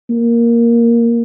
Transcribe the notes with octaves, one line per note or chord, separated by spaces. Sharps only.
A#3